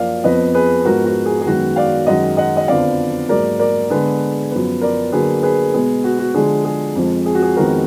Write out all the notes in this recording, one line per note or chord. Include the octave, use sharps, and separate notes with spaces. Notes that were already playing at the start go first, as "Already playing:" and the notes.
Already playing: F#2 F3 A#3 D5 F5
F2 F3 B3 B4 D#5
G#4 B4
G#2 F3 G#3 B3 F#4 A#4
F#4
G#4
G#4
F#2 D#3 G#3 B3 F#4
D5 F5
F#2 D#3 G#3 D#5 F#5
D#5 F#5
D#5
F2 D3 F3 B3 D5 F5
G#2 F#3 A#3 A#4 D5
A#4 D5
D3 G#3 B3 G#4 B4
F#2 F3 B3
A#4 D5
D3 F#3 A#3 G#4 B4
G#4 B4
B2 G#3 B3 G#4
F#4
F#4
D3 F3 G#3 G#4
G#4
F2 F3 G#3
G#4
F#4
G#4
F2 D#3 G#3 B3 F#4 A#4